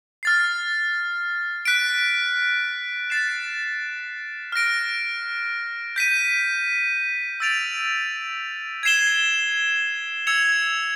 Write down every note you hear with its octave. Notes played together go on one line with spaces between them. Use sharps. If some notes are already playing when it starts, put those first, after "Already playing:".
F6 A6 C7
F#6 B6 D7
A6 C7 E7
F6 A#6 D7
G6 B6 D#7
E6 A6 D7 F7
G#6 C7 E7 G7
E6 G#6 C#7 F7